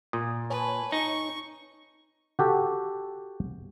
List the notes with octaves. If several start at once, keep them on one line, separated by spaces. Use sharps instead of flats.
A#2 D#6
B4 C#5 G#5 A5
D#4 C#6
F#4 G4 A4